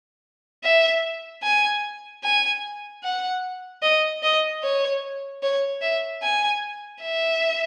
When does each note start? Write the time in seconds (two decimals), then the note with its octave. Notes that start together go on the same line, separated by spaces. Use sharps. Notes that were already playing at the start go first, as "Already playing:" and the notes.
0.64 E5
1.43 G#5
2.24 G#5
3.03 F#5
3.83 D#5
4.23 D#5
4.63 C#5
5.43 C#5
5.82 E5
6.23 G#5
7.02 E5